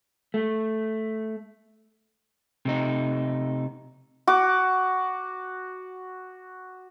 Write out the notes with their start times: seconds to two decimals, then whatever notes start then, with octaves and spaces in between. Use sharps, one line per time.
0.34 A3
2.65 C3 A3 D#4
4.27 F#4 D6